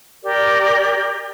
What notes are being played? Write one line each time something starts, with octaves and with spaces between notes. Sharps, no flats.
G4 A#4 D5